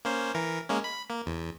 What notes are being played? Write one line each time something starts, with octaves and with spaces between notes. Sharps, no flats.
A#3 C#4 C5
E3 A#4
G#3 A#3 C#4
B5
A#3
E2